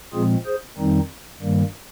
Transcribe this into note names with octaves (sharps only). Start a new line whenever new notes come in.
A#2 F3 G#3 C4 F4 G#4
G#4 C5
F2 D#3 G3 C4 D#4
G2 D#3 G3 A#3